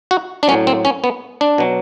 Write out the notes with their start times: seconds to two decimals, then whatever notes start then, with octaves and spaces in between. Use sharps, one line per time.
0.11 F#4
0.43 D4
0.48 F#3 C#4
0.51 A2
0.67 C4
0.85 C#4
1.04 B3
1.41 D4
1.58 B2 F#3